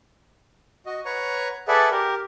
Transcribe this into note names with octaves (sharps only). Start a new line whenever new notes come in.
F#4 D#5
B4 C#5 F#5 A#5 C#6
G#4 A4 B4 D5 E5 F#5
G4 A#4